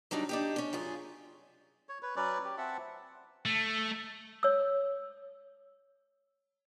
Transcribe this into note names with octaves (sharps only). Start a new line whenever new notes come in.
F#3 G3 D4 D#4
D4 D#4 G4
C#4 D4
F#2 F4 G#4
C#5
B4 C#5
F#3 C#4 B4 D5
G4
C4 E5 F#5 A5
A3
C#5 E6